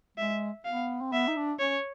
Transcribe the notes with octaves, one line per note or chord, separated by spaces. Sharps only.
G#3 E5
B3 F5
C4
B3 E5
D#4
D4
C#4 C#5